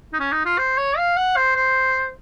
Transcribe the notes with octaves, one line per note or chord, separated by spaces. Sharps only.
D#4
C#4
D#4
F4
C5
C#5
F5
F#5
C5
C5